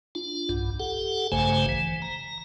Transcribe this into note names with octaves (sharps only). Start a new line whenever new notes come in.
D4 F4
B1 G2
G4 A4 F#5
A#1 G2 C#3 A3 C5 G#5
E3
A#5